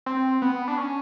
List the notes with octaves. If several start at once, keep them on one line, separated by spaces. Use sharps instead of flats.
C4
B3
D4
C#4